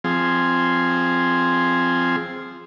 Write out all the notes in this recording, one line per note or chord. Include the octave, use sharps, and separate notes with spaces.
F3 C4 G#4